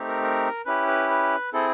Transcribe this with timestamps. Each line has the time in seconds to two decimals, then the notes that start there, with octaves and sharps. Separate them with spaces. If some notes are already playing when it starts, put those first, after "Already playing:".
Already playing: A3 C4 D#4 G4
0.08 A#4
0.22 A#4
0.65 C#4 E4 G4 B4
0.87 B4
1.10 B4
1.53 C4 E4 G#4 A4